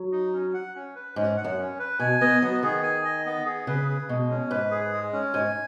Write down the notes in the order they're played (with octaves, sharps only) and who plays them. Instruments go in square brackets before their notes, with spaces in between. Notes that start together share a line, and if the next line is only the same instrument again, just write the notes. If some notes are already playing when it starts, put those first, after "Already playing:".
Already playing: [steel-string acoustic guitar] F#3
[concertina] D#4
C#4
F#5
C#4
B4
[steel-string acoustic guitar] G#2 [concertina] C#4
[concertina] F#5
[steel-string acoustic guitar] F#2
[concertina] C#4
B4
[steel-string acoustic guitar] B2 [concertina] G#5
[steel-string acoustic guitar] B3 [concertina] D#5
[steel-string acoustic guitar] F#3 [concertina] B3
[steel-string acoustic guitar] D#3 [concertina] G#4
[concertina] G#5
D#5
B3
G#4
[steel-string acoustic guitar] C#3 [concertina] B4
[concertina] G#4
[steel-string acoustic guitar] B2 [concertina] G#3
[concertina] C#4
[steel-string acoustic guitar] G#2 [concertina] B4
[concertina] G#4
G#3
C#4
[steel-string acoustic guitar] G#2 [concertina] G#5